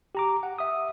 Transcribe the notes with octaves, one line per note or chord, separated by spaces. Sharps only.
G4 A#5 D6
F#5
E5 D#6